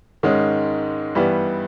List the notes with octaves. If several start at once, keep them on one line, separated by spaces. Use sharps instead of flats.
G#2 D#3 G#3 C#4
G2 E3 G3 B3